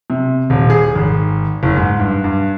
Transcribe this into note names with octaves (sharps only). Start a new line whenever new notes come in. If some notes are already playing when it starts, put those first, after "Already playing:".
C3
D#1
G#4
G#1
F#1
G#2
G2
G2